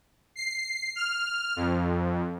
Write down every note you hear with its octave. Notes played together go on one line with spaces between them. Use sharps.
C7
F6
F2